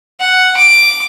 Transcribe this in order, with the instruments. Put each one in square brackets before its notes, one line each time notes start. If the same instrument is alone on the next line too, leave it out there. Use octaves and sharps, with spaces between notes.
[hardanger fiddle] F#5
D6